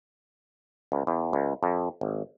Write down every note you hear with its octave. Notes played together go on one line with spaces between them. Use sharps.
C#2
E2
C#2
F2
G#1